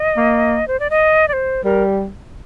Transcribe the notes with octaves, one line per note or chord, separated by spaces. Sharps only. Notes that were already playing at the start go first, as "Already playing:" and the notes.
Already playing: D#5
A#3
C5
D5
D#5
D5
C5
G3 A#4